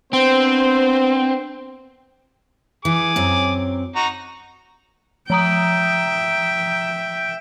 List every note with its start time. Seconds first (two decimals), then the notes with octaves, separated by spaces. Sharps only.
0.13 B3 C4 D4 C5
2.85 E3 G#4 D6
3.16 F#2 F#3 C4
3.96 D#4 F#4 A#5
5.30 F3 E5 G5 A#5 D#6